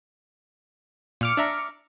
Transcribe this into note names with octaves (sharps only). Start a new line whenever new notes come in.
A#2 D6 F6 C#7
D4 E5 A#5